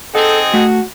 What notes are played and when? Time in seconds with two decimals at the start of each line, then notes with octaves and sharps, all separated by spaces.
0.15 C4 D#4 G#4 A4 F#5
0.54 A3 F#4